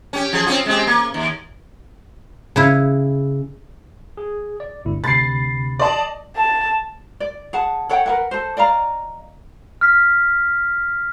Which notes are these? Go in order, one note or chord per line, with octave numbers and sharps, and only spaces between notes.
C#4 G4
F3 G#4
C4 C#4 F4
G#3 C4 G4
A#3
D#2
C#3 E4
G#4
D5
G1 D2 E4
D2 C3 B5 A6 C7
D5 D#5 A5
A5
D5
G#4 F#5 A5
A4 C#5 F#5 G5
A#4 B4 F#5
A4 C5
D5 D#5 F5 A#5
F6 B6